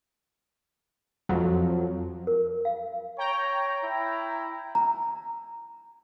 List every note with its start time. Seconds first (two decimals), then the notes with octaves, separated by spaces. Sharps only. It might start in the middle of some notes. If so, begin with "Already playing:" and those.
1.29 F2 F3 F#3
2.27 A#4
2.65 F5
3.18 C#5 G5 A#5
3.84 E4
4.75 A#5